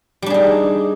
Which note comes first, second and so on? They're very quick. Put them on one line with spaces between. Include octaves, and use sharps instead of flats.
G3 D4 G#4 D#4